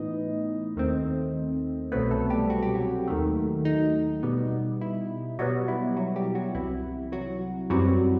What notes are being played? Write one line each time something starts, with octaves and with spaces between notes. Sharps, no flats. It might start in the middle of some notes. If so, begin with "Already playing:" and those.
Already playing: A2 E3 B3 D#4 D#5
D#2 D#3 A3 C4
C2 B2 F#3 A3 B3 C4 B4
A3 A4
G3 G4
F#4
G4
F#3 F#4
D#2 D#3 A3
D#4
B2 G3 B3
E4
B2 F#3 G3 B3 F#4
E4
F#3 F#4
G3 G4
F#3 F#4
C2 C3 E3 E4
F#3 F#4
F#2 E3 F#3 G3 C4 F#4